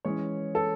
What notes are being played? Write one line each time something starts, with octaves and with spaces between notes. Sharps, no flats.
E3 G#3 C#4 C#5
A4